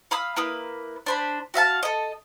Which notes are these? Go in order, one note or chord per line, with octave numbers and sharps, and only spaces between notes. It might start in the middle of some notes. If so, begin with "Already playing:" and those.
F5 B5 D#6 E6
A#3 E4 B4 D#6
D4 C5 B5
F#4 E5 F5 A5
A4 D#5